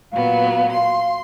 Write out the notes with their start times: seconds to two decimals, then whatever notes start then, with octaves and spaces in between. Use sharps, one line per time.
0.12 A#2 F#3 B3 F5
0.73 C6